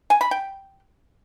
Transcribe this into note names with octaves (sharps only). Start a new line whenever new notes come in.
G#5
B5
G5